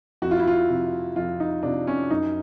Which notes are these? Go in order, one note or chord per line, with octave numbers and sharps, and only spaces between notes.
F2 F#4
F4
E4
F4
C3 F3
F2 F4
D#4
C3 F3 D4
C#4
F#2 D#4